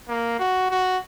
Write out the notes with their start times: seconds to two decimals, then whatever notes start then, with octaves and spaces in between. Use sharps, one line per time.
0.09 A#3
0.39 F#4
0.70 F#4